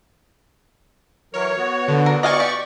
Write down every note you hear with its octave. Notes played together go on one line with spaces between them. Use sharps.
E3 F#3 A#4 C#5
B3 F#4
D3
A#4
D5 D#5 F5 G#5 C#6
G4